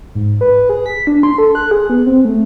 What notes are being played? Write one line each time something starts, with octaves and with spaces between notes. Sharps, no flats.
G#2
B4
G#4
B6
D4
C6
A4
F#6
G#4
B3
C4
A3